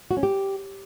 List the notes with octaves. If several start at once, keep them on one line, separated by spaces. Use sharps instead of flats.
F#4
C#4
G4